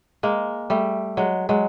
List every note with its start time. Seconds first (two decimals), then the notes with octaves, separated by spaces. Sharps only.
0.23 G#3 A#3
0.70 G3 A3
1.17 F#3 G#3
1.49 F#3 G#3